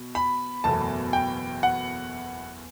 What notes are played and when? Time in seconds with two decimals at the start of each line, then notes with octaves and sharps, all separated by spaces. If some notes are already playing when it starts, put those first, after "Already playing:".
Already playing: B2
0.15 B5
0.64 F#1 E2 B2 F#3 A3 A5
1.13 G5
1.63 F#5